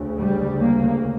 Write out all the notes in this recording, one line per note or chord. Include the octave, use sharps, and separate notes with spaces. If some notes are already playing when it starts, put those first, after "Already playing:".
Already playing: D2 C#3
G3
A#3